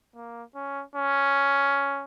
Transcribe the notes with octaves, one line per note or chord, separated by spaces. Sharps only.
A#3
C#4
C#4